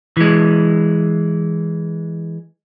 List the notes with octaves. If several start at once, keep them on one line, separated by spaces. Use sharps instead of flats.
E3 G#3